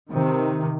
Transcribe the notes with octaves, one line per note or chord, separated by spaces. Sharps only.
C3 D#3